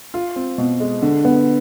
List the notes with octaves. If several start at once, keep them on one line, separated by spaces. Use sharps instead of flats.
F4
C4
B2
G#3
D3
B3